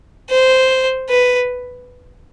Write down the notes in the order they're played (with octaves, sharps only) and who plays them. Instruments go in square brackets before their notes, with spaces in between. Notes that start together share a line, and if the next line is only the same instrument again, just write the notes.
[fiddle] C5
B4